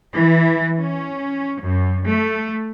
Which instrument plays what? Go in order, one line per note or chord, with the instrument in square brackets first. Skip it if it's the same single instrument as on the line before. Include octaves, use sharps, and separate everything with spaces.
[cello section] E3
C#4
F#2
A3